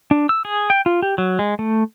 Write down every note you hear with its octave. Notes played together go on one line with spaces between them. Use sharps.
D4
E6
G#4
G5
F4
G4
F#3
G#3
A3